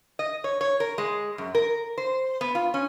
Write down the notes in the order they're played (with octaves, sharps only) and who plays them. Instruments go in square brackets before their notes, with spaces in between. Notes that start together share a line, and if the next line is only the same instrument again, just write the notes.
[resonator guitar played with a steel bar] D#5
C#5
C#5
A#4
G#3
F#2
A#4
C5
B3
F4
C#4